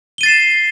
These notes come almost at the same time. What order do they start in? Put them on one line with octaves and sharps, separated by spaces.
G7 D#7 A6 C7 E7